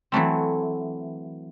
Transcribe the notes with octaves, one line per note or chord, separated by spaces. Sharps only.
E3 F#3 A3 C4